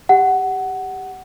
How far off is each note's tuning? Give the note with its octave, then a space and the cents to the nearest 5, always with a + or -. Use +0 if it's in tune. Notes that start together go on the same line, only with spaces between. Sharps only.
G4 +15 F#5 +15